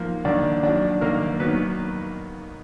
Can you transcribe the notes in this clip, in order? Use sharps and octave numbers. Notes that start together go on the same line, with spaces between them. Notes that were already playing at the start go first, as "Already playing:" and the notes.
Already playing: G#2 F3 A#3
D#2 D4 D5
D#3 F#3 D4 D5
D#2 A#3 A#4
D#3 F#3 B3 B4